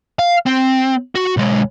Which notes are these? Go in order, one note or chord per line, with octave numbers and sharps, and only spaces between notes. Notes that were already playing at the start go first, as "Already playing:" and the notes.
F5
C4
F#4
B1 G#3